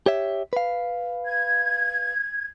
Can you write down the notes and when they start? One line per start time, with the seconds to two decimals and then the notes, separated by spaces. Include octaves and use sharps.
0.06 G4 C#5 E5
0.53 B4 F5
1.26 G#6